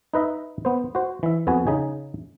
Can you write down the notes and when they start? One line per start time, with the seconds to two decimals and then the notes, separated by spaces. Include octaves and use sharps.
0.13 D#4 B4 D#5 E5
0.65 B3 C5
0.95 F#4 C5
1.23 E3 E5
1.47 F2 B3 F#4 G#4 G#5
1.67 C#3 D#4 G#4 G#5